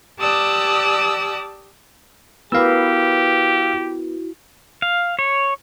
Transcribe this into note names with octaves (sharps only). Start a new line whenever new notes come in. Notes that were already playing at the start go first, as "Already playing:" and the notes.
G4 D5 A5 D#6 E6 F#6
B3 E4 F#4 G4 A#4 B4 F5 E6
F5
C#5